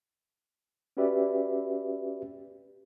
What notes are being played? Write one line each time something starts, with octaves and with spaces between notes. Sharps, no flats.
C#4 F#4 G4 B4 D5 E5